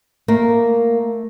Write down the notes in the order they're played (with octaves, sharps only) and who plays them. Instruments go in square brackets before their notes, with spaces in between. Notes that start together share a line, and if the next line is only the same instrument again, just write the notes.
[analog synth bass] A3 [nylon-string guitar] A#3